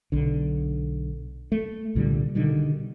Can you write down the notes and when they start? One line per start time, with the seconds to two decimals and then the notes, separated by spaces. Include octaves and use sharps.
0.12 B1 D3
1.52 A3
1.95 C2 A#2 D3 G3
2.35 B2 D3 D#3 G3